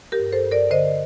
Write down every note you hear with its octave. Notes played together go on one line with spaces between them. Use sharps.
G4 A#4
G2
A4 C5
G2
A#4 D5
D3 C5 D#5